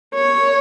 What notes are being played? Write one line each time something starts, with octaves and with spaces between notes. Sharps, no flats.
C#5